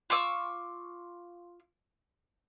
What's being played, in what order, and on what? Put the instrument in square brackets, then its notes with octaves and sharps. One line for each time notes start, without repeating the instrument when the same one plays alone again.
[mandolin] F4 C#6 D6 E6